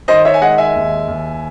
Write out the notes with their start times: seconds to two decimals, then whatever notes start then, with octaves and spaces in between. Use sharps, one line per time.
0.08 D#3 C5 D#5
0.25 C#5 E5
0.34 G#5
0.42 G#3 D#5 F#5
0.58 E5 G#5
0.75 D#2
1.08 D#2